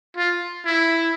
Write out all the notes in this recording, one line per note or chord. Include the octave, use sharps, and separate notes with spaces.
F4
E4